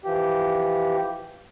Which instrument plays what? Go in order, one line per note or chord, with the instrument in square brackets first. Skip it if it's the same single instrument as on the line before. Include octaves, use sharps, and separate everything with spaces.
[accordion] E3 F3 G4